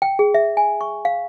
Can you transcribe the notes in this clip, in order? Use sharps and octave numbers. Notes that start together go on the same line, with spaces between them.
G5
G#4
E5
G#5
C#6
F5